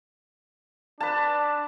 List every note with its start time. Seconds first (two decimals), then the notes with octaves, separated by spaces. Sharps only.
1.00 D4 B4 A5